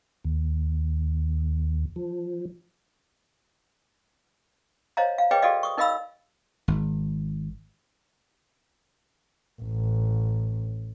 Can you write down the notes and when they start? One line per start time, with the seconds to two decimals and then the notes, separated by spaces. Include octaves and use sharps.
0.25 D#2
1.96 F3
4.97 C5 C#5 D#5 F5 A#5
5.18 F5
5.31 G#4 B4 C#5 D#5 G5 D6
5.42 F#4 G#4 A4 D5 D#5 F5
5.63 C#6 D#6
5.77 D#4 A#4 D#5 F5 B5 E6
6.68 G#1
9.62 A1